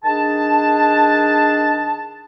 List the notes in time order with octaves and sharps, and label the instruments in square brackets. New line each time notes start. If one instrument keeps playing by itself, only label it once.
[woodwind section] D#3 D4 G#4 A5